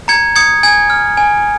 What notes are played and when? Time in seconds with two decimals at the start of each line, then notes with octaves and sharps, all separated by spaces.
0.08 A#5 G#6 C#7
0.36 D#6 G#6 C#7
0.63 G#5 G#6
0.90 F6
1.17 G#5